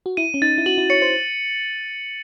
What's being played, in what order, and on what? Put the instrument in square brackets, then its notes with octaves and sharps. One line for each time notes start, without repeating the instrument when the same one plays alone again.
[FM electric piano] F#4
[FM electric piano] E4 [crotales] D#7
[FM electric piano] C#4
[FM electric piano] D#4 [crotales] A6
[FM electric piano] E4
[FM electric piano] F#4 [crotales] F#7
[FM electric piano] E4
[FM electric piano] C#5 [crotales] C#7
[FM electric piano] C5